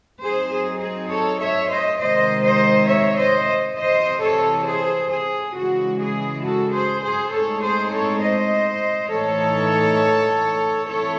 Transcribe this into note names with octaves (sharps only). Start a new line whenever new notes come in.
F#3 C4 D#4 G#4 C5
G#4
G#4
A4 C#5
C#5 E5
C5 D#5
C3 D#3 G#3 C5 D#5
C5 D#5
C#5 E5
C5 D#5
C3 E3 C4 C5 D#5
A4 C#5
G#4 C5
G#4
C#3 E3 G#3 F#4
G#4
F#4 A4
G#4 C5
G#4 C5
A2 G#3 C4 D#4 A4 C#5
G#4 C5
A4 C#5
C5 D#5
A2 E3 A3 D#4 A4 C#5
E3 A3 C4 E4 A4 C#5